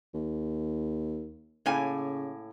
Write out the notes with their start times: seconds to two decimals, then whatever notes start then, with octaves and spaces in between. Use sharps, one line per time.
0.14 D#2
1.66 A2 C#3 A#3 G#5